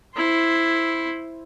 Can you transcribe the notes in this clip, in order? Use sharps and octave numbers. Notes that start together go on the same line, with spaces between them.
E4 C5